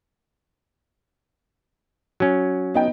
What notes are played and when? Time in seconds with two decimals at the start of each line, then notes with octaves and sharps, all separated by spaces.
2.20 F#3 C#4
2.74 B3 D#4 G5